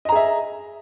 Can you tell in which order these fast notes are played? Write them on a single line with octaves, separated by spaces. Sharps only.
D#5 A#5 G#4 E5